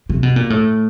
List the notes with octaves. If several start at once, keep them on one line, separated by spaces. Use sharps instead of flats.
C3
B2
A#2
A2